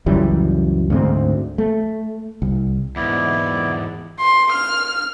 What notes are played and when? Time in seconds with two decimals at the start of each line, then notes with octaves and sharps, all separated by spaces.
0.06 C#2 F#2 E3 G3
0.90 D2 G#2 C4
1.58 A3
2.42 C2
2.96 E2 G#2 B3 E4 D5
4.19 C6
4.52 F6